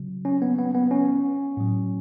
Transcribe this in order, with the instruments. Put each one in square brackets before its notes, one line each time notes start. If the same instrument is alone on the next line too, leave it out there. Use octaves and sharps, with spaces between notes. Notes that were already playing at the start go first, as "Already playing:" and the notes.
Already playing: [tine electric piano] C#3 F#3
C#4
B3
B3
B3
C#4
A2 F#3